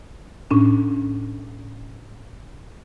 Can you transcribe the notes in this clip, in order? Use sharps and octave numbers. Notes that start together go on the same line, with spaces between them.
A2 C#4 D4